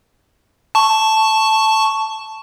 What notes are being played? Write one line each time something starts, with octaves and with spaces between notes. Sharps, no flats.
A5 C#6